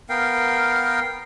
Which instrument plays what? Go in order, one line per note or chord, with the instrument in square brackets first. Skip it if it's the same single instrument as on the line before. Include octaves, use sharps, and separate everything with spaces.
[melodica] B3 A#4 F5 G5